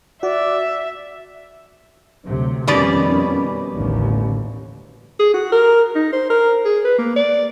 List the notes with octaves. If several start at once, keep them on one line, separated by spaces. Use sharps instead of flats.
F#4 D5 E5
D2 C3 F#3
F2 B2 D#3 G3 C#4 D5
A1 D#2 D3
G#4
F#4
A#4
D#4
C5
A#4
G#4
B4
A#3
D5